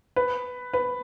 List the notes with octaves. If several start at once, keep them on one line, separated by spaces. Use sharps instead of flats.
B4
B4